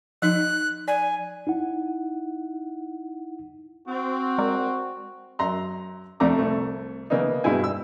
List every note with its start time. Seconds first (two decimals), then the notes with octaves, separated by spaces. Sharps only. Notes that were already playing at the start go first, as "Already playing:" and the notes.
0.22 F3 D#4 F#6
0.88 D5 G#5
1.47 D#4 E4 F#5
3.88 C4 F#4
4.38 G#3 A#4 D5
5.39 F#2 A#5 C6
6.20 F2 C3 A3 D4 A#5 D6
6.39 C2 A3
7.10 C#3 E3 A#3 B3 D4 D#4
7.44 G2 B2 G#3 E4 G#5
7.64 E6